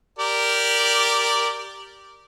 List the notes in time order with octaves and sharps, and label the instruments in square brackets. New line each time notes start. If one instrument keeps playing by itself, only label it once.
[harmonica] G4 A#4 D5